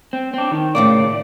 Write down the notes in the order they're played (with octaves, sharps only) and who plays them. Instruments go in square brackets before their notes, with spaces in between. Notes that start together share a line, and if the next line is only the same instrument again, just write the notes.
[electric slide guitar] C4
C4 D4
D#3
[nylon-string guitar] A2 C#3 A#3 [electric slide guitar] D5